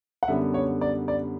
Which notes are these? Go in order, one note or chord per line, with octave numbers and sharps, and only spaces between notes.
F#5
F#2 D3 G3 B3 E5
C#5
D5
D5